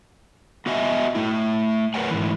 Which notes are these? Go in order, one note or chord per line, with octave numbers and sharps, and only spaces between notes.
B3 F#4 D#5 E5 G#5
A3 E4
G#4 A#4 B4 C#5 F#5 G#5
G#2 E3